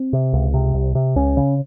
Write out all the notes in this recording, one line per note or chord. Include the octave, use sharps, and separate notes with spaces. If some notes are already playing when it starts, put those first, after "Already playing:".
Already playing: C4
C3
C#2
C3
C2
C3
C#2 C#4
C#3